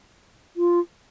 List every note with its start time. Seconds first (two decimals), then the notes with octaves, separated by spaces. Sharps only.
0.57 F4